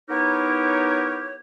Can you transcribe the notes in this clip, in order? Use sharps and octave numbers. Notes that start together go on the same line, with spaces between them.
B3 D#4 E4 G4 A#4 C#5